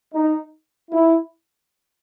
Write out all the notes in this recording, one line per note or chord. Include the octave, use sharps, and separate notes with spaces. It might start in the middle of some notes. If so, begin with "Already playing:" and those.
D#4
E4